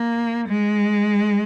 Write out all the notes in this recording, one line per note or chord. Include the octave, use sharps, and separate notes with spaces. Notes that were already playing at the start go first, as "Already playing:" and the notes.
Already playing: A#3
G#3